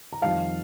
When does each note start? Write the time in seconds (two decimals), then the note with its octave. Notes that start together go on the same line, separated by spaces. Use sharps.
0.13 A#5
0.22 F2 D#3 G3 F5 A5